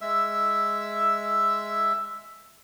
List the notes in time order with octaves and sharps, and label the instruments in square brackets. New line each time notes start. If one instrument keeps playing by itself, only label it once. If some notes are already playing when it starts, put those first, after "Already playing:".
[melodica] G#3 E5 E6